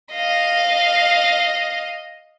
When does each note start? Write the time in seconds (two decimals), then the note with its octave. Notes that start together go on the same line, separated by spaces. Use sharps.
0.13 D#5 F5